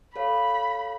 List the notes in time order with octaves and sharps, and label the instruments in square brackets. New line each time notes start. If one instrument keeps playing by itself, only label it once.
[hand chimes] A4 C#5 F5 [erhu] B5